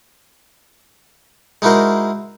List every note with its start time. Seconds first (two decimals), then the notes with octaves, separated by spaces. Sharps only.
1.62 G#3 D#4 E4 F#4 A#4 C5